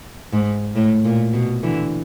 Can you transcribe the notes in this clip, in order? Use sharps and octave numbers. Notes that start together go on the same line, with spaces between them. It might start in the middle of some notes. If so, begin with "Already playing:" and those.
G#2
A2
A#2
B2
D3 E3